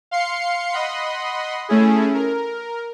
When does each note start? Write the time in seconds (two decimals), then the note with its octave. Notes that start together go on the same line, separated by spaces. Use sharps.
0.11 F5 C6 C7 C#7
0.72 D#5 F#5 B5 C6
1.69 A3 C#4 E4 G#4
2.14 A#4